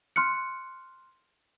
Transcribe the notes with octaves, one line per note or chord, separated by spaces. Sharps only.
C6 F6 F#6 C#7